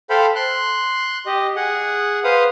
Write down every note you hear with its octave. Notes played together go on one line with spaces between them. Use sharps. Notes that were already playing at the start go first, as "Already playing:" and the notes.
A4 C5 F5 G5 B5
C6 F#6
G4 D#5
G#4 F#5
B4 C5 F5 D#6